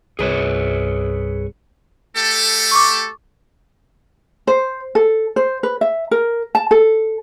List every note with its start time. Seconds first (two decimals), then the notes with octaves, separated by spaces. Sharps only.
0.19 C2 G2 G#4 B4 C#5
2.15 A3 G4 A4
2.71 C#6 D6
4.47 C5
4.95 A4
5.36 C5
5.63 B4
5.81 E5
6.11 A#4
6.55 A5
6.71 A4